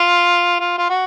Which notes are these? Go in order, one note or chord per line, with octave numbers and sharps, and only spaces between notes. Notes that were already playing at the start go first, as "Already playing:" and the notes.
Already playing: F4
F4
F4
F#4